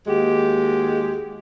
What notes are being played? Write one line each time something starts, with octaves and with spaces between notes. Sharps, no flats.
D#2 G#3 F#4 G4